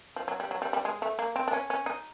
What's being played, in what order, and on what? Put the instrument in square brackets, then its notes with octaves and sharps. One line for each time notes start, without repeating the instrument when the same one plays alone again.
[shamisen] F3
F#3
G3
F#3
G3
G3
G#3
A3
A#3
C4
D4
C#4
C#4
D#4